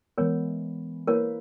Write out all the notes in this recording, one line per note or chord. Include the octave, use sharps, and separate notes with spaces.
E3 G#3 B3 A#4 C#5
A#3 E4 A#4 B4 C#5